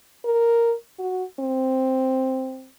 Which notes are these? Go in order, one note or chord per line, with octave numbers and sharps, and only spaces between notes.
A#4
F#4
C4